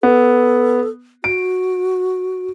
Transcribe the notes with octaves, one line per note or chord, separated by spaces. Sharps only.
B3 A4
F#4 D7